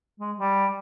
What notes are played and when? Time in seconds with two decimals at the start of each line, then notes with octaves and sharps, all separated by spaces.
0.20 G#3
0.38 G3